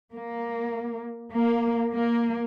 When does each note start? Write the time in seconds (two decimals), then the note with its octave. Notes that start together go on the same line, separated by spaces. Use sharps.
0.12 A#3
1.33 A#3
1.95 A#3